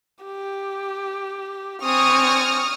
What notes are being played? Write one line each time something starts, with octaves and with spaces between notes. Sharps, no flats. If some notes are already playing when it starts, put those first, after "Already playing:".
G4
C4 G#5 C#6 D#6 F6